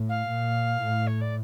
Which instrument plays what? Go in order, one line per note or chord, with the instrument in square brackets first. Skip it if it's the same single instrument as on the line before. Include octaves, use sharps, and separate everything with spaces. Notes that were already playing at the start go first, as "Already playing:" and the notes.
Already playing: [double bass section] A2
[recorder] F5
[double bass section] A#2
A2
[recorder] C#5
D5